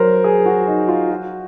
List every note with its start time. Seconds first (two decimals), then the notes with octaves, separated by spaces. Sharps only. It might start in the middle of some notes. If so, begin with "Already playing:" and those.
Already playing: F#3 A#4 C5
0.24 G#4
0.46 F#4
0.68 D#4
0.88 F4
1.10 F#4